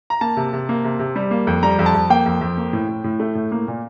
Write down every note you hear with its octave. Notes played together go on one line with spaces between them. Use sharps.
A#5
A#3 A5
C3
C3
A#3
C3
C3
G3
A#3
F2
G3 A#5
F2
A5
F2
A#3 G5
F2
F2
A#3
A2
A2
A2
A3
A2
A#3
A#2